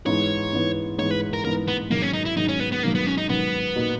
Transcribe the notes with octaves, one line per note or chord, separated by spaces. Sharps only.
G#2 E3 B3 C#5
G#2 E3 B3
G#2 E3 B3 C#5
B4
A#4
G#2 E3 B3 A#4
B3
G#2 D#3 F#3 A#3
C#4
D#4
E4
G#2 D#3 F#3 D#4
C#4
B3
B3
G#2 D#3 F#3 A#3
B3
C#4
D#4
G#2 D#3 F#3 B3
A#2 A#3 D#4 F#4